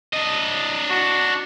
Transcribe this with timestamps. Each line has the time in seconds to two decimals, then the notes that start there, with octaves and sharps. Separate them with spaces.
0.13 D4 D#5
0.90 F#4